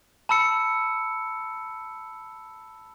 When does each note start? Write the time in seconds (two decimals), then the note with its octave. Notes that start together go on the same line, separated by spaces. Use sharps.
0.29 A5 B5 E6 C#7